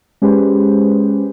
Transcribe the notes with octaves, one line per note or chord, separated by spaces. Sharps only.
G#3 C#4 G4 G#4 B4 C5